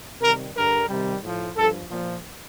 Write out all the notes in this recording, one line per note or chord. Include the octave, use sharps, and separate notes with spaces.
C3 D#3 G3 A#4
G2 D3 G3 A#4
C3 D#3 G3
A2 F3
G2 F3 A4
A#2 F3